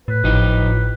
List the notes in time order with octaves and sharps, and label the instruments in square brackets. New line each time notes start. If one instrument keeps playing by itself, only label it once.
[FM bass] A2 [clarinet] B4
[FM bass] G#1 [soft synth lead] A2 [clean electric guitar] F3 D#4 G4